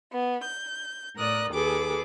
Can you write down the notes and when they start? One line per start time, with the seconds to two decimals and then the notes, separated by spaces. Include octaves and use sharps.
0.13 B3
0.45 G6
1.16 A2 A#4 D5 D#6 F#6
1.52 D#2 G#4 A4 B4 D6